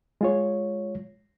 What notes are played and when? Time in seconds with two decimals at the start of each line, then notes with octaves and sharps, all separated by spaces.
0.21 G#3 F4 C#5